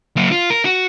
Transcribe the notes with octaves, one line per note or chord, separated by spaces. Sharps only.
F#3 A#3
F4
A#4
F#4